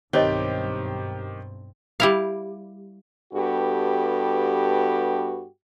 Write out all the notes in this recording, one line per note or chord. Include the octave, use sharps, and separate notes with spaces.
B1 G2 D#3 C4 G4 C#5 D#5
G3 E4 F5
G2 B3 F#4 G4 A4